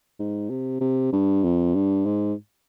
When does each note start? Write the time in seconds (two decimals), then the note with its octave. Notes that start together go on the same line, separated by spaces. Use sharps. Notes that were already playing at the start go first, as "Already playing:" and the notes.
0.20 G#2
0.50 C3
0.81 C3
1.13 G2
1.44 F2
1.75 G2
2.06 G#2